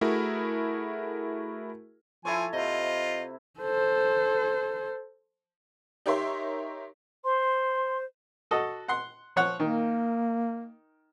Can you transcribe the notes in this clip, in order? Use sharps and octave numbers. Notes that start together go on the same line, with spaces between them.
A3 E4 F#4 G#4 A#4
F3 E4 A4 C#5 G#5
C3 F4 D#5
A4 C5
D#4 G4 A#4 C#5 E5 C6
C5 C6
F#4 A4 D#5
F#5 C6
F3 C#5 F#5
D#3 A#3